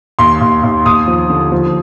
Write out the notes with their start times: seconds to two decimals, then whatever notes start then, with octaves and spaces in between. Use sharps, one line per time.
0.19 D#2 C6
0.41 D#2
0.63 D#2
0.86 D#2 D#6
1.08 F3
1.30 D3
1.52 F3